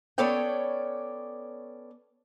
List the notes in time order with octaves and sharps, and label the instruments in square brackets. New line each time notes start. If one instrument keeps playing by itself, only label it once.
[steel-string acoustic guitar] B3 C#4 A4 C#5 D5 G5